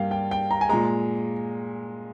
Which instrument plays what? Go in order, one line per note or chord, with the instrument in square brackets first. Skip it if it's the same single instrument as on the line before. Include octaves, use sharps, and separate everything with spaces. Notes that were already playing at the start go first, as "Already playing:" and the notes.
Already playing: [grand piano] G2 G3 A#3 F5 G5
G5
G5
A#5
G#5
A#2 G#3 A#5